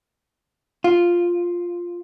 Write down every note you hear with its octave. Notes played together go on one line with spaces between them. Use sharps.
F4